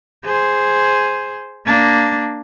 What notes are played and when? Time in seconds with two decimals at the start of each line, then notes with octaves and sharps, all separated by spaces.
0.25 G#4 C5
1.66 A#3 D4